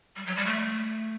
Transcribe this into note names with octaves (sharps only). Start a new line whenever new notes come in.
G3
F#3
G3
A3